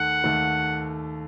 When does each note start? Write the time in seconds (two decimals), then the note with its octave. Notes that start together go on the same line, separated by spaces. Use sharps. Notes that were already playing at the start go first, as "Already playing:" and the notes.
Already playing: D#2 D#3 A3 F#5
0.24 D#2 D#3 A3